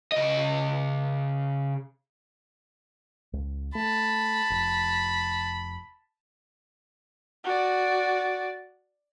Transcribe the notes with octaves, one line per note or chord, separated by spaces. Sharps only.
C#3 D#5
C#2
A3 A5 B5
F1
F#4 D5